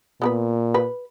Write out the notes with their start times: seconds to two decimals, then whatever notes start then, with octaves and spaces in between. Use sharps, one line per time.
0.22 A#2 B3 A#4 B4
0.74 B4